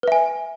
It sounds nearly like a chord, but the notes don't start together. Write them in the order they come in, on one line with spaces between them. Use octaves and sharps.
B4 E5 G#5